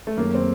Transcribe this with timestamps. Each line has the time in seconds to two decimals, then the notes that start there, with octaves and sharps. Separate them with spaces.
0.07 A3
0.16 F#2 D#3 G#3 A#3 C#4
0.35 C4